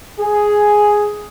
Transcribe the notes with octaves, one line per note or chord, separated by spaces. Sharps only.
G#4